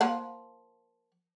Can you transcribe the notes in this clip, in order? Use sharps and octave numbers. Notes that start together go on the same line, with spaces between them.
F3 A#3 F#5